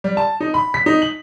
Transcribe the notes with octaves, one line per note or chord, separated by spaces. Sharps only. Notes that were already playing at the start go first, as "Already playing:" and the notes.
G3
A5
D#4
B5
B6
D#4
F#7